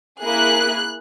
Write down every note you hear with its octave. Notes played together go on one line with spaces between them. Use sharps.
A#3 E4 G#4 F#6